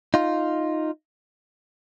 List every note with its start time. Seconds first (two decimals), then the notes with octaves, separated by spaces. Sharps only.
0.14 D#4 F4